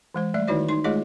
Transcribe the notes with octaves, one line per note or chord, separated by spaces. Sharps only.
E3 G#3 C5
G3 A3 D5 E5
D#3 D#4 E4 F#4 C#5 D5
D#4 C6
G#3 A3 F4 G#4 C#5 D#5